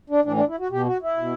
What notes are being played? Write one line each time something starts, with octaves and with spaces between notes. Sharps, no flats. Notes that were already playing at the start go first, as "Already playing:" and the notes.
D4
A2 E3 D4
D4
E4
F#4
B2 G4
F#4
E4
B2